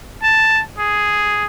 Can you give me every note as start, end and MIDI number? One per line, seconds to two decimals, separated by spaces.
0.23 0.62 81
0.78 1.46 68